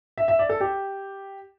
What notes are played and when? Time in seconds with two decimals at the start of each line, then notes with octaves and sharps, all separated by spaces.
0.18 E5
0.28 E5
0.39 D5
0.49 A4
0.61 G4